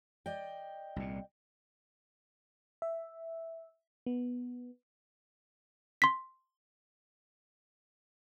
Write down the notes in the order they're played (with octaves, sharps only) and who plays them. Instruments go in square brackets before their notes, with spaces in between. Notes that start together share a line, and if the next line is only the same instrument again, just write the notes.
[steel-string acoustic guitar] D5 D#5 G5
[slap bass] C2 A#2
[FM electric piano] E5
B3
[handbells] C6 B6